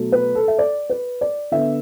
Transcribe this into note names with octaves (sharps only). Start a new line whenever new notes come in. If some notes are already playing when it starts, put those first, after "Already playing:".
Already playing: B2 F#3 A3
B4
A4
E5
D5
B4
D5
D3 B3 E5